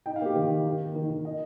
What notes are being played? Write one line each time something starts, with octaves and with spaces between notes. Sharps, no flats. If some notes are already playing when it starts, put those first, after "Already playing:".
D#4 G5
F5
A#3 G4
D#3 A#4
D#3
D#4
A#3
D#3 A#4
D#3
D#4 D#5